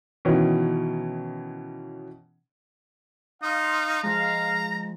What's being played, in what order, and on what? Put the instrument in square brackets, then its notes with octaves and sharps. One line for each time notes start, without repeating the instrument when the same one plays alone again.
[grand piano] B2 D#3 E3 C#4
[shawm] D#4 [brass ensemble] F5 [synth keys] C6 D#6
[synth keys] F3 G#3 [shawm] A#5